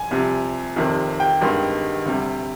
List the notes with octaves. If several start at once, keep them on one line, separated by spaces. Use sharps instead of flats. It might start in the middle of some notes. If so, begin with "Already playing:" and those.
Already playing: G#5
C2 C3 F3
F1 F2 C3 D#3
G5
G#1 G2 D#3 G#3
D2 C3 G3